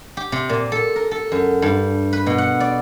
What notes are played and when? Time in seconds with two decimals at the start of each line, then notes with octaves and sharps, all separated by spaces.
0.17 G4
0.32 C3
0.49 A#2
0.72 A4
0.96 A#4
1.11 A4
1.32 F#2
1.62 G2
2.13 B4
2.26 B2
2.38 F#5
2.60 D5